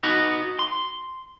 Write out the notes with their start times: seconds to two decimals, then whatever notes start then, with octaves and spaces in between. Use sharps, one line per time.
0.03 B3 D#4 F#4
0.59 C6